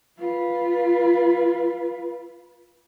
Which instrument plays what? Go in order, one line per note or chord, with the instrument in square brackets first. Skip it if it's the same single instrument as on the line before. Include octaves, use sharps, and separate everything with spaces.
[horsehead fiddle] F4 B4